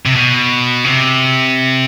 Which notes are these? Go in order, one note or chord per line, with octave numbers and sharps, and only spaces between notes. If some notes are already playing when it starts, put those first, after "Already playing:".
C3
B2
C#3
C3